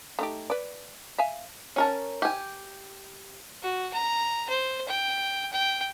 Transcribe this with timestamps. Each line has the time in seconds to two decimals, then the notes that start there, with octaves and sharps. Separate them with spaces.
0.19 A3 D#4 G4
0.50 B4 D5
1.18 E5 F5 G#5
1.76 C#4 A#4 A5
2.22 G4 G#5
3.62 F#4
3.93 A#5
4.49 C5
4.88 G5
5.52 G5